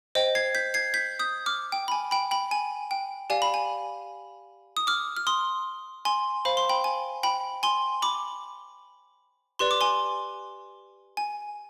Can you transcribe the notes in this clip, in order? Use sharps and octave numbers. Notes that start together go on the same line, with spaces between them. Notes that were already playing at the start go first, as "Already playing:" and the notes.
C5 D#5 G5
G#6 C7
G6 B6
G#6 C7
G6 B6
D#6 G6
D6 F6
G5
B5
G#5
G5 B5
G5 B5
G#5
G5
G4 D5 F5 G#5
B5
G#5
D#6
D6 F6
F6
C6 D#6
G#5 C6
C5 F5 B5
C6
G5 B5
G#5
G5 B5
G#5 C6
B5 D6
G4 B4 D5 C6
D6
G#5 C6
G#5